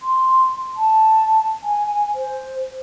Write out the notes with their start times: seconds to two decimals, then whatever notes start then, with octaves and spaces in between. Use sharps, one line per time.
0.01 C6
0.77 A5
1.64 G#5
2.15 C5